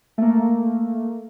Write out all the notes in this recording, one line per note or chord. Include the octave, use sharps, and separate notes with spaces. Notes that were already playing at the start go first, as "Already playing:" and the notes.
A3 A#3